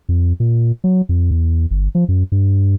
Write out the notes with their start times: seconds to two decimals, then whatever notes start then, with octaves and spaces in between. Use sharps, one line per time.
0.09 F2
0.40 A#2
0.84 F#3
1.09 F2
1.31 E2
1.71 G1
1.95 F3
2.08 F#2
2.32 G2